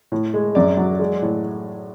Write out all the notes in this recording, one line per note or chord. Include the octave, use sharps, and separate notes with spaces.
A2
G#3
F#2 D5
F#3
G#3
A2